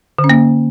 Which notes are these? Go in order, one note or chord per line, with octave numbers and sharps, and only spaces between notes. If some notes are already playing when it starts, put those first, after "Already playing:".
D3
C#4
A#3